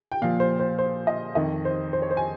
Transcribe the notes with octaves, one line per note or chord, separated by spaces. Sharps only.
G5
A#2 F3 F5
C5
C5
C5
D#5
F2 D#3 D#5
C5
C5
C#5
C5
G#5